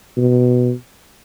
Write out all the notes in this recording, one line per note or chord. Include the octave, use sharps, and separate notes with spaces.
B2